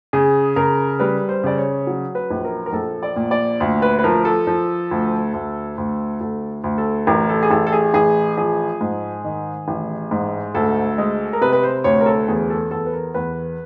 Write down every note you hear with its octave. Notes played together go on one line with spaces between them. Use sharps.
C#3 G#4
C#3 A#4
G3 B4
C5
C#3 D5
C#5
F#3
B4
A#1
A#4
A#4
A#1 A4
D5
A#2
D5
D2
B4
B4
F3 A#4
A4
F3
D2
D2
D2
D2 A4
D2
A4
A1 A#4
A4
G#4
A1 A4
A4
G#4
A1 G#4
F3 G#4
G#2
D#3
A1
G#2
D2 A4
G#3
A#4
C3 B4
B4
C5
D2 C#5
A#4
A4
E2 G#4
A4
E2 A4
B4
A#4
E2 B4